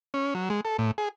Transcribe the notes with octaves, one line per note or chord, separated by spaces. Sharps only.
C#4
F#3
G#3
A4
A2
G#4